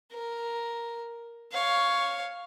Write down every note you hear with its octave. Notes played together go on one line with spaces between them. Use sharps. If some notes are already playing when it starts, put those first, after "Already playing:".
A#4
C#5 F5